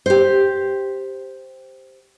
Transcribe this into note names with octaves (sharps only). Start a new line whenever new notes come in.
G4 C5